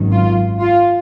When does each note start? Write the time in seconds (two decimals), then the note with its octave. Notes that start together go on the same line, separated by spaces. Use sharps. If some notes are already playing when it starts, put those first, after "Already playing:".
Already playing: G#1 F#2 D#3 F#3
0.12 F4
0.61 F4